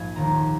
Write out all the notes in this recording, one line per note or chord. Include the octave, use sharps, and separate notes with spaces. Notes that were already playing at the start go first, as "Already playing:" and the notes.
Already playing: A#1 G#2 F5 G#5
F1 D#2 D#3 A#5